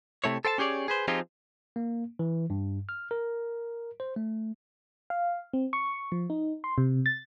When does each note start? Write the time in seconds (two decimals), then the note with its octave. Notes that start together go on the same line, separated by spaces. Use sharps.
0.24 C3 A3 E4 C#5
0.45 A4 C5 G5 A5
0.58 C#4 G4 G#4 C#5 D5
0.88 G#4 B4 C5
1.08 F3 C4 D#4 F4 G4 G#4
1.76 A#3
2.19 E3
2.50 G2
2.89 F6
3.11 A#4
4.00 C5
4.16 A3
5.10 F5
5.53 C4
5.73 C#6
6.12 F3
6.30 D#4
6.64 C6
6.78 C3
7.06 A6